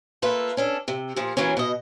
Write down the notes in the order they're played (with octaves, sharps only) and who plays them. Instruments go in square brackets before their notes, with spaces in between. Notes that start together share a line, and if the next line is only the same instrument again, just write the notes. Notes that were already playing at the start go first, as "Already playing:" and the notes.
[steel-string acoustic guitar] A3 A#3 F4 A4 B4
C#4 D4 A4
C3
A#2 F3
E3 F#3 A#3 C#4
B2 D#5